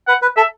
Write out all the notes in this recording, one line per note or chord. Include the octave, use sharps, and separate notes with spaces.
B4 F#5
B4
A4 E5